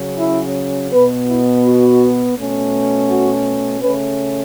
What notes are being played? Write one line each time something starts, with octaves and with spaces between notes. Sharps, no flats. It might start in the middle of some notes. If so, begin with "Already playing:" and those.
Already playing: C#3 F#3 C#4
E4
B2 B3 B4
E4
F#4
B2 A3 C#4
F#4
C#3 A3 C#4 B4